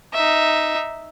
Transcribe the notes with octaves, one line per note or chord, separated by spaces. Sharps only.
D#4 E5